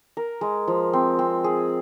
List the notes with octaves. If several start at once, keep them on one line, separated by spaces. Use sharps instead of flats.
A#4
G#3
F3
C4
C4
G#4